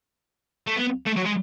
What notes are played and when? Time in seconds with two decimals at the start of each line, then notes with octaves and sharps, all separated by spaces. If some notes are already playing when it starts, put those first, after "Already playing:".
0.67 A3
0.76 B3
1.06 A3
1.16 F#3
1.26 G#3